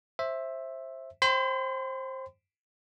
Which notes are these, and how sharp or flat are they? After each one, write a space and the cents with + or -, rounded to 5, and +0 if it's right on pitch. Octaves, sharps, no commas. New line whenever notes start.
C5 +20 E5 +0
C5 +20 G5 +0 C6 -45